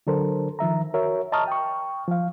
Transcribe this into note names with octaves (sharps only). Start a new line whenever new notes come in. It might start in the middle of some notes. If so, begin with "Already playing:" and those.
D3 F#3 D4 A4 A#4 C5
D#3 F3 E5 A#5
F#4 A#4 C#5 E5
D#5 A5 A#5 C#6 D#6 F6
G5 C#6
F3 F5